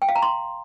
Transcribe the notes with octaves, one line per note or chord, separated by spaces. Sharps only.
G5
F5
A#5
C6